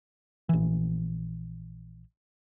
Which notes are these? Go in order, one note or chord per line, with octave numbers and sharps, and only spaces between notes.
A#1 E3